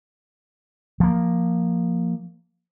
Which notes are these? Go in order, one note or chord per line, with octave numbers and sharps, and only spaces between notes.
F3 A#3